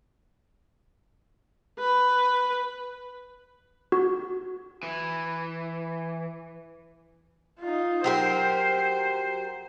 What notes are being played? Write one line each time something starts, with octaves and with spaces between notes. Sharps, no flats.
B4
F#4
E3
D#4 F4
F#3 G4 A#4 C5